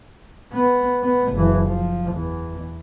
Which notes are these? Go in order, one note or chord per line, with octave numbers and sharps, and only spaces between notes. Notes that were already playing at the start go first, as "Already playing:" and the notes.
B3
B3
F#1 E3
F3
E2